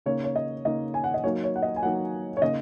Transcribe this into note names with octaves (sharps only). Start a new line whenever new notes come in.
C#3 A#3 D#4 C#5
C#5
D#5
C#3 A#3 D#4 D#5
G#5
F#5
D#5
F#3 A#3 D#4 C#5
C#5
F#5
D#5
G#5
F#3 A#3 D#4 F#5
C#5
C#3 A#3 D#4 D#5